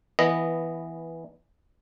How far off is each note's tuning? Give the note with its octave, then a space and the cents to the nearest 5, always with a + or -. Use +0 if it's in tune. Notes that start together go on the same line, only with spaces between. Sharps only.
E3 +0 B3 -5 D#5 -5